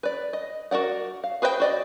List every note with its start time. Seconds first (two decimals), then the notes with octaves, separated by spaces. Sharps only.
0.03 B4 D5
0.33 D#5
0.71 F#4 A#4 D5 F#5
1.24 F5
1.42 G#4 B4 C5 D#5 G5
1.60 F#4 D5 D#5